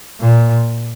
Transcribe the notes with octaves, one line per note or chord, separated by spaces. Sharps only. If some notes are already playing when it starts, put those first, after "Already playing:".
A#2